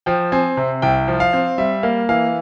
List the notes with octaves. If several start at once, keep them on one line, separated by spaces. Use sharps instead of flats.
F3 G5
C4 G#5
C3
C2 G5
F3
F5
C4
G3 E5
A#3 F5
E3 F5